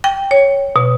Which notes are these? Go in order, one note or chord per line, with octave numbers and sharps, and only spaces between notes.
G5
C#5
B2